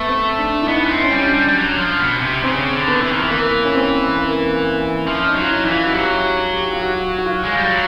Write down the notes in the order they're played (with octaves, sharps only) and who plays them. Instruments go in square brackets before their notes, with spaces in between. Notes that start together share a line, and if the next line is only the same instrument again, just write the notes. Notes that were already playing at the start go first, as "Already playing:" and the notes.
Already playing: [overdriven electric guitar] A3 [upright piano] B3
[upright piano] C4
D4
E4
[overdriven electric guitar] B3 [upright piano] D#4
[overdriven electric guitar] C#4
C4
[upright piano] C#4
[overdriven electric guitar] G3 [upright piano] D4
[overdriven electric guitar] G3
G3
F#3
F3
B2
C3
[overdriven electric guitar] C#3 [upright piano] C4
[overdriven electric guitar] D3
[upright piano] B3
[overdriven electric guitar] E3
D#3
E3
[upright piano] A#3
C#4
C4
A#3
[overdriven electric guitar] F3 [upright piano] C#4
[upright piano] D#4
[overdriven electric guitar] F#3
[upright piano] F4
E4
[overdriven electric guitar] E3
[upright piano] F4
F#4
[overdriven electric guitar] F#3 [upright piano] G4
[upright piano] F#4
G4
F4
F#4
F#4
F4
[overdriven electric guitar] G#3
G3
F#3